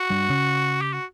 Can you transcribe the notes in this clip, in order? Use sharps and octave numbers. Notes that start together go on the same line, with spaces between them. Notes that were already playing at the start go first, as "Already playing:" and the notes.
Already playing: F#4
G2 G3
C#3 C#4
G4
F#4